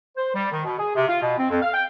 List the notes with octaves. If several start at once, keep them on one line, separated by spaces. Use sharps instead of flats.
C5
G3
D#3
B2
G#4
C3
F4
B2
C4
F2
F5
G5